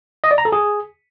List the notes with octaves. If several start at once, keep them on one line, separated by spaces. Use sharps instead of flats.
D#5
D5
A#5
A4
G#4